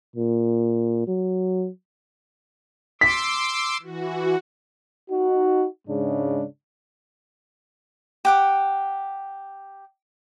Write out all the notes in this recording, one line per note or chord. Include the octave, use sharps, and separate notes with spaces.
A#2
F#3
C6 D6 E6 B6
E3 F#4
D#4 F#4
G#2 C#3 G#3 D4
G4 F#5 D6